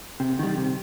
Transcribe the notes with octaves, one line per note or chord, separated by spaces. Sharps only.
C3
D#3 G3
C3